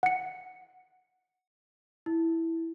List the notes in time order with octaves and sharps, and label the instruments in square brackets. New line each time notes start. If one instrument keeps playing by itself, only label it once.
[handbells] F#5 C#7
[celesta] E4